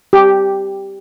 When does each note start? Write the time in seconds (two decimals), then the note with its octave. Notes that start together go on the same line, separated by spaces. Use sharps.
0.13 G4